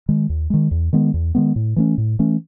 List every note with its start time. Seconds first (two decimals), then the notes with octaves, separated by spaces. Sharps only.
0.09 D#3 G#3
0.29 D#2
0.50 D#3 G#3
0.71 E2
0.93 D#3 G#3 B3
1.14 E2
1.35 D#3 G#3 B3
1.56 A2
1.76 E3 A3 C#4
1.98 A2
2.19 E3 A3 C#4